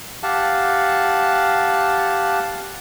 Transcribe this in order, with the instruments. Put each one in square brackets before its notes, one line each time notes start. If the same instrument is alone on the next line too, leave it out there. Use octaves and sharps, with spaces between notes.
[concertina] G4 F5 F#5 A5